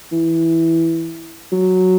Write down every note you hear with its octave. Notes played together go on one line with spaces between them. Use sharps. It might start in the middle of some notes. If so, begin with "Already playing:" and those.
E3
F#3